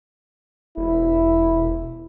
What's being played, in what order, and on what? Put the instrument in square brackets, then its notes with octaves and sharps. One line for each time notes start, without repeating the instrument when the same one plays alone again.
[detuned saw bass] E1 [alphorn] E4